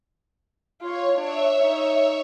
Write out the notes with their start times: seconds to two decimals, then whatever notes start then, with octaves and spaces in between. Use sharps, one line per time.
0.82 F4 C#5
1.18 D4 C#5 E5
1.62 D#4